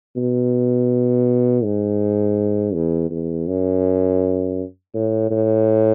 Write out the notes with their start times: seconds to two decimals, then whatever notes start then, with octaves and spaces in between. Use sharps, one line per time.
0.16 B2
1.64 G#2
2.74 E2
3.11 E2
3.47 F#2
4.94 A2
5.30 A2